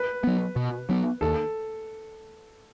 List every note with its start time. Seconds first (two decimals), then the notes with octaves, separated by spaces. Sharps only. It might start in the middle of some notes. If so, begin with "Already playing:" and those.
Already playing: B4
0.24 F#3 B3
0.56 B2
0.89 F#3 B3
1.21 D#2 A4